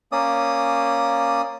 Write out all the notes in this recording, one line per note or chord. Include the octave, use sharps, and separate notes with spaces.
A#3 C#4 D5 D#6